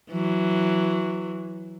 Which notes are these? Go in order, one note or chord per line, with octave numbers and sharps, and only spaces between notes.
E3 F#3